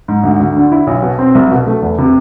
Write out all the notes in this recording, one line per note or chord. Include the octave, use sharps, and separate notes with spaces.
G#2
D2
D2
D3
E4
B1
B2
C4
C2
B2
A3
E2
C3